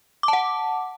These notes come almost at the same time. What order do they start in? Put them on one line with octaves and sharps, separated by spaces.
D6 A5 F#5